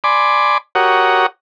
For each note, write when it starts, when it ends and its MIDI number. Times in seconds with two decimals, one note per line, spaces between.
0.04 0.58 74
0.04 0.58 80
0.04 0.58 83
0.04 0.58 84
0.04 0.58 86
0.75 1.26 66
0.75 1.26 67
0.75 1.26 70
0.75 1.26 73
0.75 1.26 78
0.75 1.26 87